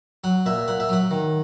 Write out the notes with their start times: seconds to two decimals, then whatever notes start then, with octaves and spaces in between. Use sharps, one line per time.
0.24 F#3 F#5
0.46 A#2 E5
0.68 A#2 F#5
0.80 E5
0.89 F#3 F#5
1.11 D#3